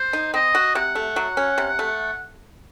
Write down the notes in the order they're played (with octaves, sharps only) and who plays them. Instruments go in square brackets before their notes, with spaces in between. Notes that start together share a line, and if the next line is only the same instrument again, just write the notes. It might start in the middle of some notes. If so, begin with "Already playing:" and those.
Already playing: [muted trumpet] C5
[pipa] D#4
[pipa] C4 [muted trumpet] D#5
[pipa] F#4
[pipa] C3 [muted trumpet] F#5
[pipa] A3
F#3
C#4
C3
A3